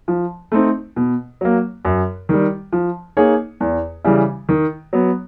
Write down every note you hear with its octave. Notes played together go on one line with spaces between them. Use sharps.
F3
A3 C4 D#4
B2
F#3 A#3
F#2
D#3 G3
F3
A#3 D#4 G#4 C#5
E2
C#3 E3 G3
D#3
F#3 B3